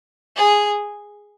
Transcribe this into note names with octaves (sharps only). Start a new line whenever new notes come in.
G#4